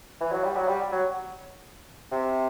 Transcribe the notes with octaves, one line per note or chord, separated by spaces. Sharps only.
E3
F#3
G3
F#3
G3
F#3
C3